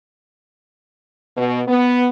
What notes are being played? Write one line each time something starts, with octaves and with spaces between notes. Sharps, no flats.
B2
B3